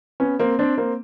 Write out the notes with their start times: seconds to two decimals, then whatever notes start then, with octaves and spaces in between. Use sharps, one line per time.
0.20 B3 C#4
0.39 A#3 C4
0.59 C4 D4
0.77 A#3 C4